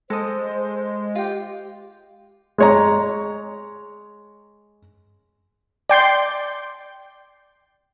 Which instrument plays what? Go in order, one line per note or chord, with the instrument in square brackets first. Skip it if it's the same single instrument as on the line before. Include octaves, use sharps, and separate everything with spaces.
[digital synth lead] G#3 [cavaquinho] A4 D#6 [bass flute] C5
[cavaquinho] F4 G5 [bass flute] G4
[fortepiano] G#3 C#5 A#5
[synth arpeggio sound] D5 G5 C6 G6